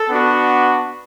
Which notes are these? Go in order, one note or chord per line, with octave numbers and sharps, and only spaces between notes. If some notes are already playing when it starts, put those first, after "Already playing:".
Already playing: A4
B3 D4 F#4